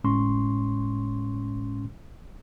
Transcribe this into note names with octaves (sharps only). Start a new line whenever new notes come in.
G1 A2 G#3 C#4 C6 C#6